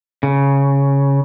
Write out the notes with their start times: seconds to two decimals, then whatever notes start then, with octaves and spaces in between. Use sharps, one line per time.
0.23 C#3